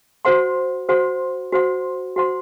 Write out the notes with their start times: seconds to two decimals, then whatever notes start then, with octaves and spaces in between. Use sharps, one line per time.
0.25 F#4 C5 F#5 C6
0.89 F#4 C5 F#5 C6
1.52 F#4 C5 F#5 C6
2.16 F#4 C5 F#5 C6